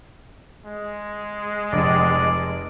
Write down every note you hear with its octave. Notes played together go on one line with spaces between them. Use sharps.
G#3
F1 D5